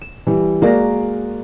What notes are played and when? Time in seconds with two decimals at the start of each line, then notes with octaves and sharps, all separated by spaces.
0.01 E7
0.27 E3 G3
0.62 G#3 A#3 F#4 A#4 D5 A#6